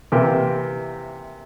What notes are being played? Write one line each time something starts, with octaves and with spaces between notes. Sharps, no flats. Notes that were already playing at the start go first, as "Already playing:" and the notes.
C3 E3 A#3 E4 G4